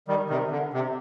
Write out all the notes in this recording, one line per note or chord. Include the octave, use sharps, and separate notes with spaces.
D#3 G3
C3 D#3
D3
C3